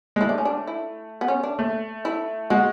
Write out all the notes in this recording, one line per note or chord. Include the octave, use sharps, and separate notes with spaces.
G#3
A3 E4
D4
C#4
D4
E4
B3
C#4
D4
A3
E4
G#3 F#4